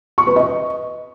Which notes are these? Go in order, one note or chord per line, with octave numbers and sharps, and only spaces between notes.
C#6
B4
D#5